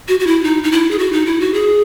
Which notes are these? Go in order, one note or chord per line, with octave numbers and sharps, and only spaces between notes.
F#4
F#4
E4
D#4
D#4
E4
G#4
F#4
D#4
E4
F#4
G#4